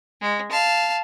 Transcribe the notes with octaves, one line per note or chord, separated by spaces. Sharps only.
G#3
F5 A5